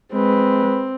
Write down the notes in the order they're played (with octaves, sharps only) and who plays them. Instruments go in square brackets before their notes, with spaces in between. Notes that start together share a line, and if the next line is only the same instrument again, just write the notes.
[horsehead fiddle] G#3 B4 [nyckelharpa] C4